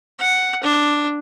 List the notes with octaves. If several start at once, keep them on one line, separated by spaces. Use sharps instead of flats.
F#5
D4